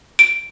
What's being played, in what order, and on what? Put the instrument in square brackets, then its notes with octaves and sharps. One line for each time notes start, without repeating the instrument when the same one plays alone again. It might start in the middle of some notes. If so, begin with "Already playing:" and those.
[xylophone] D7